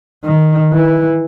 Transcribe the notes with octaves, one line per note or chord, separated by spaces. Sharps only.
D#3
E3